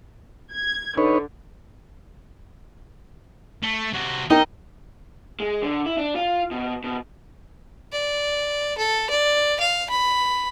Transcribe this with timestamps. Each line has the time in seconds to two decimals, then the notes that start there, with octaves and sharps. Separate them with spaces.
0.52 G#6
0.98 D3 D#4 B4 C#5
3.63 A3
3.93 C3 F#4
4.30 D#4 A#4 D#5 G5 A#5
5.40 G#3
5.63 D3
5.86 E4
5.98 D4
6.16 F4
6.51 B2
6.84 B2
7.92 D5
8.78 A4
9.10 D5
9.60 F5
9.90 B5